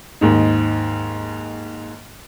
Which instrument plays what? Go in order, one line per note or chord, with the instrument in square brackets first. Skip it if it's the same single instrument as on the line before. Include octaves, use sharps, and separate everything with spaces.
[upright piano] D#2 G#2 D#4